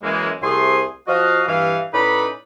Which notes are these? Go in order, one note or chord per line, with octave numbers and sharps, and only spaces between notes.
F#2 E3 G#3 A#3
C2 C3 A3 G#4 G#5 C6
F3 F#4 D#5 F5
G2 E3 F5
A2 C#4 D#4 B4 D5 B5